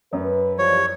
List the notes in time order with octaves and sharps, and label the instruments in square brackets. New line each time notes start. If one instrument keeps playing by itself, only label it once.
[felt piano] F#2 [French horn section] B4
[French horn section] E3 F3 G3 [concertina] C#5